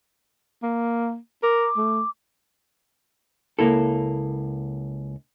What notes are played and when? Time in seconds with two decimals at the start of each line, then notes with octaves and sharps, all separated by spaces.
0.63 A#3
1.43 A#4 D6
1.77 A3
3.59 C#2 A#3 E4 A4